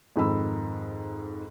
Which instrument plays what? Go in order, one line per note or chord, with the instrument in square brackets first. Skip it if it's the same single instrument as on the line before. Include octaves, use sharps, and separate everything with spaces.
[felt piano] F2 G#2 D#3 B5 E6